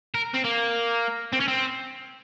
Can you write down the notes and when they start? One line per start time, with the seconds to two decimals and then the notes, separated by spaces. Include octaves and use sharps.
0.14 A#4
0.34 C4
0.44 A#3
1.33 C4
1.40 C#4
1.48 C4